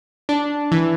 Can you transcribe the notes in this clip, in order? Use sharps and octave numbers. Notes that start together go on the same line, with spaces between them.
D4
E3